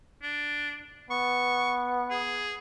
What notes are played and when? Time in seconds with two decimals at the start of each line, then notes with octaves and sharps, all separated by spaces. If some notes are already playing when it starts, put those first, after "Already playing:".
0.22 D4
1.10 B3 C#6
2.10 G#4